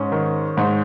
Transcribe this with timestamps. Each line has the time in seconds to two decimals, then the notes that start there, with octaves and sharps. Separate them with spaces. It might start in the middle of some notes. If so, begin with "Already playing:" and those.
Already playing: G#2 C#4
0.12 D#3
0.57 G#2